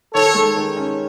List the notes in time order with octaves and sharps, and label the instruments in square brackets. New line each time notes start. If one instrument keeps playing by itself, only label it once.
[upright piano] D#3 [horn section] A4 C#5
[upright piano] G#3
D#3
C#4